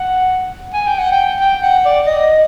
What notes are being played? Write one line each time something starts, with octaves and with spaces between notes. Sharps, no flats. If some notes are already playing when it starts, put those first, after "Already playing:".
Already playing: F#5
G#5
G5
F#5
G5
G5
F#5
D5
D#5